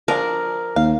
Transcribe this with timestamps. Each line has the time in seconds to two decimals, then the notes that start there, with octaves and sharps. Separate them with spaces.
0.08 F3 D4 G#4 A#4
0.76 D#2 F5